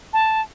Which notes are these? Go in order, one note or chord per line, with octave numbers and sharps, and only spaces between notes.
A5